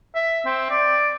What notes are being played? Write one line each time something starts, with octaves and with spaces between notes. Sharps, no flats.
E5
C4
D5